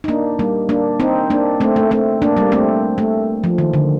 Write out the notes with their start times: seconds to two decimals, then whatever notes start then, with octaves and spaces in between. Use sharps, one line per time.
0.04 D#4
0.08 A#3 D4
0.39 G3 A#3
0.69 A#3 D4
1.00 C4 D#4
1.30 A#3 D4
1.61 A3 C4
1.76 A3
1.91 A3 C4
2.22 A#3 D4
2.37 G3 A#3
2.52 A3 C4
2.98 A3
3.44 F3
3.58 D#3
3.74 D3